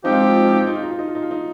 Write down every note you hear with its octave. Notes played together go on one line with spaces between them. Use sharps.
F3 G#3 C4 D#4 G4
F4
D#4
F4
D#4
F4
D#4
F4
D#4
F4
D#4
F4
D#4
F4
D#4
F4
D#4